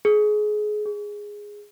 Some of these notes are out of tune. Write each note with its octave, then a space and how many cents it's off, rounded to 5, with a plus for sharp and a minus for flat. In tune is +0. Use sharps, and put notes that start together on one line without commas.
G#4 +25
G#4 -5